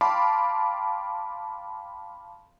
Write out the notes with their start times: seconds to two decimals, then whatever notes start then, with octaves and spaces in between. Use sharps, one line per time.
0.01 F5 G5 A5 B5 C6 D6